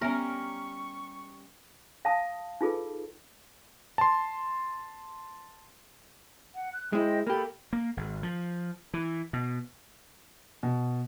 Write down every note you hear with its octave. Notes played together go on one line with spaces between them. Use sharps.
G3 B3 C#4 A#4 E5 C#6
F5 A5 D#6
D#4 F4 G#4 A4 B4
A5 C6
F#5
F#6
G#3 E4 C5 D#5 G5
A#3 G4 A4 B5
A#3
G#1
F3
E3
B2
B2